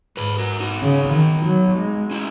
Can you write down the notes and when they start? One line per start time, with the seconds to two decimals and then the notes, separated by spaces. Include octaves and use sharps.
0.17 G#2 G#4 B4
0.39 F#4 A#4
0.60 D#4 F#4
0.83 C#3
1.14 D#3
1.46 F#3
1.78 G#3
2.11 C#4 E4